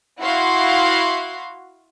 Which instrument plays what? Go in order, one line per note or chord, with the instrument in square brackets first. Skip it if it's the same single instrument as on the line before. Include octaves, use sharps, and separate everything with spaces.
[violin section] E4 F#4 F5 C6